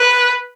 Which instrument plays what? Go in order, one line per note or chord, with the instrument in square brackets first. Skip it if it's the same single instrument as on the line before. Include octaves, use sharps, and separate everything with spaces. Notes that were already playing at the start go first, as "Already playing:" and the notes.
Already playing: [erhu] B4